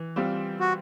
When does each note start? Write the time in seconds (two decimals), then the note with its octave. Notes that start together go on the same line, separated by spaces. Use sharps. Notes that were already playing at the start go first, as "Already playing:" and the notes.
Already playing: E3
0.16 G3 C4 F4
0.60 F#4